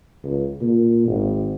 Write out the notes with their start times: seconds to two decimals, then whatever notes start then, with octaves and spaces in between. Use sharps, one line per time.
0.23 C#2
0.61 A#2
1.07 G#1